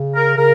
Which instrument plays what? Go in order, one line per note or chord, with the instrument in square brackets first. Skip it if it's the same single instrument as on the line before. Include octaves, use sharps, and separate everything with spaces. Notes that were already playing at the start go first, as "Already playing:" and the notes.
Already playing: [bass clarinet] C#3
[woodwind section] A#4
[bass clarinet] C#3 [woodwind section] A#4